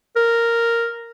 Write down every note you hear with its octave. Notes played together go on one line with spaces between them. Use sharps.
A#4